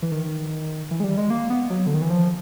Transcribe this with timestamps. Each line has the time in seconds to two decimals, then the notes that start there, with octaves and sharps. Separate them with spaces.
0.02 E3
0.12 D#3
0.91 E3
1.00 G#3
1.04 G3
1.17 G#3
1.30 A#3
1.50 B3
1.70 F#3
1.87 D3
1.94 D#3
2.01 E3
2.10 F3